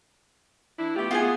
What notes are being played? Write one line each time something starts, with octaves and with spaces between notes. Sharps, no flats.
E3 D4 E4
A3 B3 F4 G4
B3 F4 G#4 G5 G#5